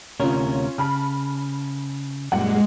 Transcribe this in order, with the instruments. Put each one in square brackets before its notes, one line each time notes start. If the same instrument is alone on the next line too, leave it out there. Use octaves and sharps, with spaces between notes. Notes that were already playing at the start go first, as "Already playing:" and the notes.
[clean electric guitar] D2 C3 A#4 [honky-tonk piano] C#4 F4
[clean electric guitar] C#3 [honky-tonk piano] A5 B5 F6
[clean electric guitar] F#2 A#2 G3 [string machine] G#3 [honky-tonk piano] F#5